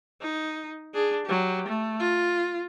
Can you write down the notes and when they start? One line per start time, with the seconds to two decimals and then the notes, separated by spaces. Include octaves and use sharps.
0.21 D#4
0.94 D4 G#4
1.26 F#3 G4
1.68 A3
2.00 F4